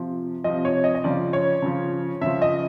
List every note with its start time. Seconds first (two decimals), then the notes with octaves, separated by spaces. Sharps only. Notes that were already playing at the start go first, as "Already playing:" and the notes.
Already playing: C3 F3
0.44 C3 F3 D#5
0.65 C#5
0.84 D#5
0.95 D#5
1.04 C#3 F3 D5
1.33 C#5
1.62 C#3 F3
2.21 C#3 F3 E5
2.42 D#5